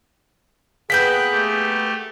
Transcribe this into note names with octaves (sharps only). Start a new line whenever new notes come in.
A#3 B3 G#4 B4 G5 F#6 G6 B6
A3 G4